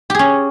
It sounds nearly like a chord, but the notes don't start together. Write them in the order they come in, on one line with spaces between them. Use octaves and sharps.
G4 G#4 C#4